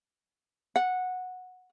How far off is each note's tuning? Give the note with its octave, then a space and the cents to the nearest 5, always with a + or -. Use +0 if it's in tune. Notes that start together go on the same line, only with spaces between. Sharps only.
F#5 -10